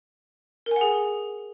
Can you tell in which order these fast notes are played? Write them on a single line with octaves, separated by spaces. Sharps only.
A#4 G#5 F#5 G#4